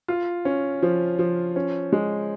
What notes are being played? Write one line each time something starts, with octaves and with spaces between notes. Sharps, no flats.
F4
C#4
F3
F3
C#4
G#3